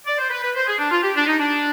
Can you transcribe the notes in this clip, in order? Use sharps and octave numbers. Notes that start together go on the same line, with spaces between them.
D5
C5
B4
B4
C5
G#4
D4
F4
G4
D4
D#4
D4